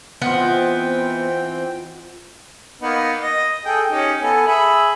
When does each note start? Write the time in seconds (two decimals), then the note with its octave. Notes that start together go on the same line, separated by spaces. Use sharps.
0.22 E3 B3 C4 F4 D#5 F#5 G5
2.81 A#3 B3 D#4
3.21 D#5
3.65 G#4 A4 G5
3.90 C#4 D#4 G4
4.21 B3 A4 G#5
4.47 G#4 E5 B5